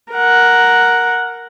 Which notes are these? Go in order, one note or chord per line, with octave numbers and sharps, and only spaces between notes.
A#4 F#5